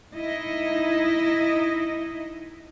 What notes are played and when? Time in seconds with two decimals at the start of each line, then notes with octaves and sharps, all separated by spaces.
0.13 D#4 E4 D#5